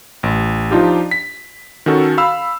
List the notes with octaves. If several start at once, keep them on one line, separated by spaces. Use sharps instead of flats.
A1
F3 D4 D#4 F4 G4
B6
D#3 C#4 F#4 A4
F5 B5 E6